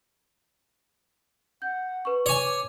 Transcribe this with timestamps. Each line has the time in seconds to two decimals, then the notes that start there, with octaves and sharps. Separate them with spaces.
1.62 F#5 G6
2.05 B4 C#6
2.26 C#5 G#5 D6